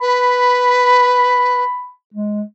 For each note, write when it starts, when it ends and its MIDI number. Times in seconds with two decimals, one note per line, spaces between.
0.01 1.64 71
0.01 1.90 83
2.14 2.42 56